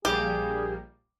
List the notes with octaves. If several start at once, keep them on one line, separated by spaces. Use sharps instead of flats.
A#1 G3 A#3 G4 G#4